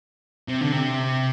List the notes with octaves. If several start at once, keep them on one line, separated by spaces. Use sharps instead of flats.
C3
D3
C3